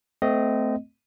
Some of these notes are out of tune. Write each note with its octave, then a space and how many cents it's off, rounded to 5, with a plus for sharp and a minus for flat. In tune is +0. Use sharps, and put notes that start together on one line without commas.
A3 +0 C4 -25 D#5 +0